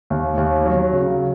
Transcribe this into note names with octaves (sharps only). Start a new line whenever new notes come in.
D#2
D#2
F#3
C#3